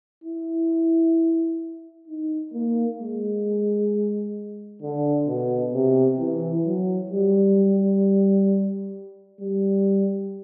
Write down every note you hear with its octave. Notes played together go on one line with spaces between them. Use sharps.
E4
D#4
A#3
G#3
D3
B2
C3
E3
F#3
G3
G3